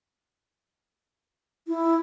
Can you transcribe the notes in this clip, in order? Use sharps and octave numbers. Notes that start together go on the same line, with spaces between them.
E4